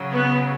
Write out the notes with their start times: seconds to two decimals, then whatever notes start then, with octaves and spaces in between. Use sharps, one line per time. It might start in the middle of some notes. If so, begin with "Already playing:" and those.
Already playing: C#3 F#3
0.14 B3